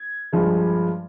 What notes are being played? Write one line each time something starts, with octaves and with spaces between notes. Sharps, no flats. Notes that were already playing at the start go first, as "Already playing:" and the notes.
Already playing: G#6
G2 F3 G#3